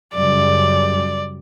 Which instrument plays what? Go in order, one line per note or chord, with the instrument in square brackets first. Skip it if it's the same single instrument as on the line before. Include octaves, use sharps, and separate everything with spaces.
[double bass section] F#2 C#3 G3 [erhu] D5